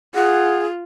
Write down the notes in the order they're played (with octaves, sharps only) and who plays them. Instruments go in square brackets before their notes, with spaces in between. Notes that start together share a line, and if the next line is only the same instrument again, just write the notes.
[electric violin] F4 [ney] G#4 [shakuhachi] F#5